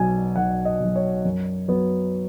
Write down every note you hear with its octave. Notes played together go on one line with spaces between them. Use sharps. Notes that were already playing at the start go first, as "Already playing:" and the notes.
Already playing: B1 B2 F#3 G#5
B1 F#5
D#5
B2 F#3
C#5
F#2
F#3 B3